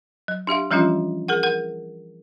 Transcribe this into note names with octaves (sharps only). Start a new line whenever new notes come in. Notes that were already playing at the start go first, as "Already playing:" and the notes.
F#3
D4 G4 E5 F5
E3 F3 G3 C#4 D4 F4
G#4 A#4 F#5
A#4 F#5